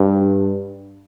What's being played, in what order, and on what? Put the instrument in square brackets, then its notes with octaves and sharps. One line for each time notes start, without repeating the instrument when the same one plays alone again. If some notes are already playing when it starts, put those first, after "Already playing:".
Already playing: [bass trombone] G2